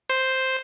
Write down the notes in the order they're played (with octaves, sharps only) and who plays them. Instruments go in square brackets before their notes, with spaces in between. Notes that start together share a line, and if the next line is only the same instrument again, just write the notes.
[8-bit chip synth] C5